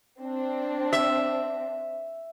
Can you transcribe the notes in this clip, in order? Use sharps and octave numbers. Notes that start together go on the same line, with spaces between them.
C4 D4
E5